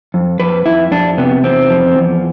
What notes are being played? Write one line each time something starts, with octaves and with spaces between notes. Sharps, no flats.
F2
F2 B4
F2 E4
F2 D4
C3 B3
E2 C4
F3
E2